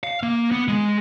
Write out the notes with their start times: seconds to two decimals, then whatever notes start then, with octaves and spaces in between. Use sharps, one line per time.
0.04 F5
0.23 A#3
0.51 B3
0.68 G#3